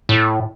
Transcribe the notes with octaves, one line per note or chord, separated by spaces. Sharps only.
A2